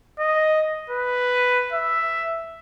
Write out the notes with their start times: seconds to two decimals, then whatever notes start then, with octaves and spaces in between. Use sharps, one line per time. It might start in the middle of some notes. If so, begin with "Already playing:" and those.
0.19 D#5
0.90 B4
1.73 E5